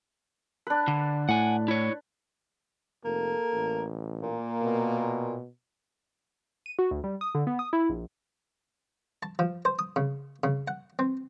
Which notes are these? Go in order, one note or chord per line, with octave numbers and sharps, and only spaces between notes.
D4 B4
D3
A2 F#5 G#5
E4 C#5
F1 A#3 A4
A1
A#2 A#3
B2
D#7
F#4
D2
G3
D#6
D3
B3
D#6
E4
A#1
A5
F3
C5
D#6
C#3
C#3
F#5
C4